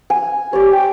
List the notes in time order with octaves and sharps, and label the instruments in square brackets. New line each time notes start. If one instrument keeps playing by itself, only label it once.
[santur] G#5
[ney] G4 [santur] C#5 D5
[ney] G5